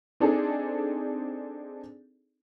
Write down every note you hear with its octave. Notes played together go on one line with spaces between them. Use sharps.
C4 D4 D#4 G#4 A4